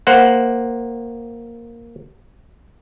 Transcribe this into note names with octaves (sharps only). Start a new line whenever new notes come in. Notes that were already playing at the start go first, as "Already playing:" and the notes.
A#3 C5 F#5